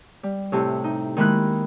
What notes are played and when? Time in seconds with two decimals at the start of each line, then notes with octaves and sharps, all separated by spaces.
0.23 G3
0.52 A2 C3
0.84 D#4
1.17 D#3 G#3 A#3 E4 B5 F#6